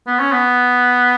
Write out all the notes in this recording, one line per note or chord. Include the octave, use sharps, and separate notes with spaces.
B3
C#4
B3